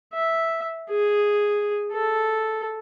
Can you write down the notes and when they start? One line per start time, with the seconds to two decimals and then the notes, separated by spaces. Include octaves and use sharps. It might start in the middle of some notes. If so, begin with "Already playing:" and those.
0.14 E5
0.90 G#4
1.93 A4